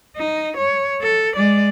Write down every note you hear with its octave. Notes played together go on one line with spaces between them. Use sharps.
D#4
C#5
A4
G#3 D5